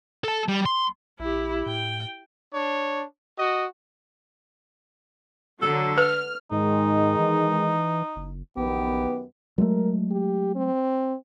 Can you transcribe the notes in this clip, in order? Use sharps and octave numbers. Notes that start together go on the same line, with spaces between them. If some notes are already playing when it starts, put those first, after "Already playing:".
A4 A5
G3
C6
A#1 E4 G4
A2 G5
D4 C#5
F#4 D#5
D3 F#3 A4
B4 F6
G#2 D#3 G#3 D#4
E3
F#1
A#1 F#2 D#3 B3 G4
F#3 G#3 A3 A#4
G4
C4